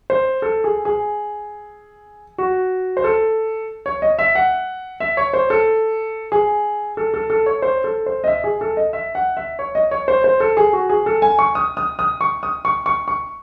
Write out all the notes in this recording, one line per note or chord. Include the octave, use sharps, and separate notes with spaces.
C5
A4
G#4
G#4
F#4
C5
A4
C#5
D#5
E5
F#5
E5
C#5
C5
A4
G#4
A4
A4
A4
C#5
C5
A4
C5
D#5
E5
G#4
A4
D#5
E5
F#5
E5
C#5
D#5
C#5
C5
C5
A4
G#4
F#4
G#4
A4
G#5
C#6
D#6
D#6
D#6
C#6
D#6
C#6
C#6
C#6